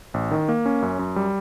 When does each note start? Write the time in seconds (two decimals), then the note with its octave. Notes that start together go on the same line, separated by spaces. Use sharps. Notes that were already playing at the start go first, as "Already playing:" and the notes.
0.14 A1
0.31 D#3
0.49 A#3
0.66 C#4
0.82 F#2
0.99 F#2
1.16 G3